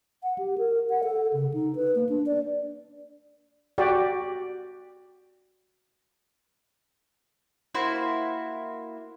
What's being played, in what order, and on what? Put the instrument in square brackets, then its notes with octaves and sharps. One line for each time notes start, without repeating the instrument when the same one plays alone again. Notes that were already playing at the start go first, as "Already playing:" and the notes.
[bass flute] F#5
G4
A#4
F#5
A4
C#3
D#4
B4
A#3
D4
D5
[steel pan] F#4 G4 D5
[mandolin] A#3 E4 F#4 C5